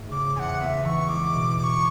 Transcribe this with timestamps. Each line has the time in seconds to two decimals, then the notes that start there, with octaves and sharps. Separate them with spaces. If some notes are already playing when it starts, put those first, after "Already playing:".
Already playing: G#2 A3
0.11 C#3 D6
0.35 E2 G#5
0.39 F#5
0.60 B3 E5
0.85 E3 C#6
1.09 G#3 D6
1.34 B2
1.59 B2 C#6 D6